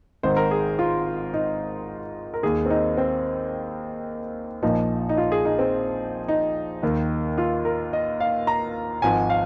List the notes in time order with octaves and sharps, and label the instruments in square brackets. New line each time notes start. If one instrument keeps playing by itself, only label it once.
[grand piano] G#1 G#2 D#3 C5
A#4
G#4
F4
D#4
A#4
D#2 D#3 G#4
C4
D#4
C4
A#1 A#2 F3 D#4
D#4
F4
G#4
D#4
C4
D#4
D#2 D#3
F4
A#4
D#5
F5
A#5
G#1 G#2 F3 G#5
F5